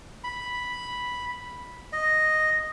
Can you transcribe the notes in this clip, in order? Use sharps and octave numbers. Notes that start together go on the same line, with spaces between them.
B5
D#5